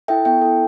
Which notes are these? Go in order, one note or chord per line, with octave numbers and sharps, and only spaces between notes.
E4 A4 E5 G5
B3 E5 G5
E4 A4